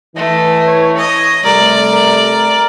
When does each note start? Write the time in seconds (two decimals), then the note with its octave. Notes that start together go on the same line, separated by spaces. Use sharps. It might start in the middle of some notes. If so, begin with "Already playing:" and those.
0.16 E3 A3 D#5
0.67 C#5
0.97 D#5
1.45 C3 G3 A3 A#4 D5
1.92 A#4